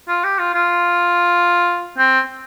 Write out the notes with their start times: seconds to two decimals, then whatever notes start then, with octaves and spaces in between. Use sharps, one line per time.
0.08 F4
0.24 G4
0.39 F4
0.54 F4
1.98 C4